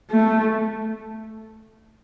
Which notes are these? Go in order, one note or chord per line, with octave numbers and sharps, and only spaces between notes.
A3